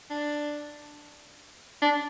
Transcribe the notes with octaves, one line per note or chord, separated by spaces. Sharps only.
D4
D4